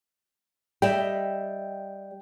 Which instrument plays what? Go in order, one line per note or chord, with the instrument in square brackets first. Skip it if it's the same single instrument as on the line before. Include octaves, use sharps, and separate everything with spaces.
[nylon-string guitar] G3 D#5 E5 [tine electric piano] G5